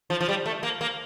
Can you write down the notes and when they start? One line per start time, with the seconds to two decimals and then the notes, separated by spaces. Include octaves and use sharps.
0.10 F3
0.21 F3
0.29 G3
0.46 A3
0.63 A#3
0.81 A#3